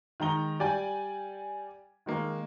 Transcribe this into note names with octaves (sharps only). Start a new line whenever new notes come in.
D#3 G#3 A#5 G7
G3 D5 G5 G#5
D#3 G#3 A#3